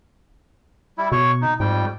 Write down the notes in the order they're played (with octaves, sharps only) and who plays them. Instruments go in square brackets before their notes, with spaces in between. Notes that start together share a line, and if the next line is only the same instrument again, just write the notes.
[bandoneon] G3 E4
[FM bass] B2 [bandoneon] C#5 C#6
[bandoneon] D#4
[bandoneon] F2 G3 G5 [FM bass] G#2